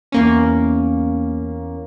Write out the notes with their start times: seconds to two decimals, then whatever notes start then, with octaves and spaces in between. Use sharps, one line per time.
0.12 E2 A#3 C#4